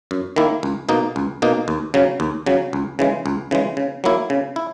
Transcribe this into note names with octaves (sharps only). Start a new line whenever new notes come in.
F#2
D#3 A#3 E4
C#2
B2 A#3 D#4
C#2
B2 A#3 D#4
D#2
C#3 F#3
D#2
C#3 F#3
C#2
C#3 E3 G#3
C#2
C#3 E3 G#3
C#3
F#3 A#3 E4
C#3
E4